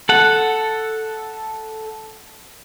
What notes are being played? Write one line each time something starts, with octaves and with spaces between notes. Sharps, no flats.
A4 F#5